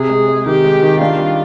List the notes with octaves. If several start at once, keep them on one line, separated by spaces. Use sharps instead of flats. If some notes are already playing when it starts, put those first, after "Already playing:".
Already playing: C3 G#4
G#3
G#3
D#3 G4
G#3
D#3
D4 F4
G3